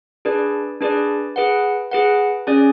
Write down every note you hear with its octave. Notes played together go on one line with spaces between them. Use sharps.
D4 G#4 B4 D5
D4 G#4 B4 D5
G#4 B4 F#5
G#4 B4 F#5
C#4 G#4 D5 G#5